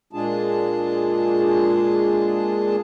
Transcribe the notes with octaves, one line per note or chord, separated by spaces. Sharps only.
A#2 G#3 D4 F4 G#4 A5